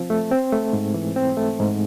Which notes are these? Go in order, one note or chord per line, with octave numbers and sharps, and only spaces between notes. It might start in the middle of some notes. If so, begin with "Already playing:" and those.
Already playing: F3 C4
A3
C4
A3
G#2
E3
C4
A3
G#2